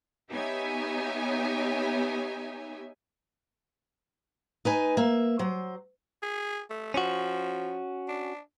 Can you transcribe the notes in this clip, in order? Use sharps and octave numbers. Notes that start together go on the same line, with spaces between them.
B3 D#4 G4 C#5 E5 G#5
D#4 B4 G#5
A#3 E5
F#3 C5
G#4
A3
F3 C#4 F#4
D4